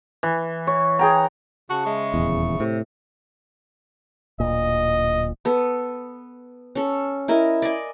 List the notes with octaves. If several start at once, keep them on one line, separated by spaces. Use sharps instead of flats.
E3
C#5
G#4 G5 A#5
C#3 F#4 A5 C#6
G#3 E5
D#1 E2
A2 C3
D1 A#2 D#5
B3 A4
C#4 A4
E4 A#4 D#5
D5 D#5 G#5